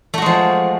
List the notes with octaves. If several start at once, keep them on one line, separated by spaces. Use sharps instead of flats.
F3 G#3 A3 F#4